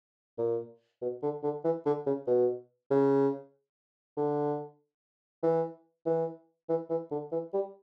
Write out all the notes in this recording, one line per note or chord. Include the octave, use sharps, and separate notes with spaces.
A#2
B2
D3
D3
E3
D3
C#3
B2
C#3
D3
E3
E3
E3
E3
D3
E3
G3